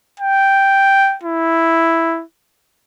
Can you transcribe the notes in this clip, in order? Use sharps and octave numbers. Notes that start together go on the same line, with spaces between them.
G5
E4